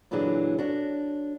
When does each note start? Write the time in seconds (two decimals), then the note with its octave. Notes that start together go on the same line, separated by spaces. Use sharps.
0.11 A#2 D3 E3 F#3 D4 G#4
0.58 D4 F#4 A4 C#5